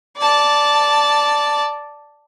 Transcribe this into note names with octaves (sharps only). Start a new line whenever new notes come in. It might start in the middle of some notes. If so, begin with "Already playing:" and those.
D5 A5